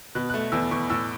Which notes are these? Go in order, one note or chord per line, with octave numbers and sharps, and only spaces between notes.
B2 F#6
F#6
A3
E2 E6
E2 C#6
A2 E6